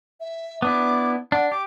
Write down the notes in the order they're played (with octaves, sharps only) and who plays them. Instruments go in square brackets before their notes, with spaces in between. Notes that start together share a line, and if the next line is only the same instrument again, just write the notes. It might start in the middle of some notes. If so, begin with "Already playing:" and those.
[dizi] E5
[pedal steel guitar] B3 D4 E4 [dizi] D6
[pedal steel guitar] D4 [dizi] F#5
[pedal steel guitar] G4 [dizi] D6